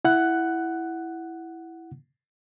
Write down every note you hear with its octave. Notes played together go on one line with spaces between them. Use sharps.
E4 F#5 F#6